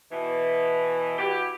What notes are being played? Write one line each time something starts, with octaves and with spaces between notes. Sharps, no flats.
B2 E3
E4 F#4 G4